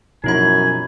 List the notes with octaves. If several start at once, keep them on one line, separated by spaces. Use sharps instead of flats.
F#2 B2 F3 D#4 E4 G#5 B5